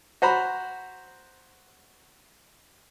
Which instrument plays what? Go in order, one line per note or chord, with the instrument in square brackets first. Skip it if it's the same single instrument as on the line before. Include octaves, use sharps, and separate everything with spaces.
[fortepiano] F#4 C5 A#5 B5